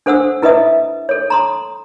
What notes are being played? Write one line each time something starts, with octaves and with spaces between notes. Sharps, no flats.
D4 A4 C5 F#5 D#6 E6
E4 B4 D#5 E5 D#6
A4 C#5
A#5 C6 D#6